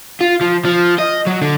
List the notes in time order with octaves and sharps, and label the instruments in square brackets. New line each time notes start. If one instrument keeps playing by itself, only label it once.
[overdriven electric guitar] F4
F3
F3
D#5
F#3
D3